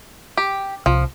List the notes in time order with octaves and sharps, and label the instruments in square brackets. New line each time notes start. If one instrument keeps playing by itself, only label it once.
[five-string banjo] G4
[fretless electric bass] C2 [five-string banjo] F3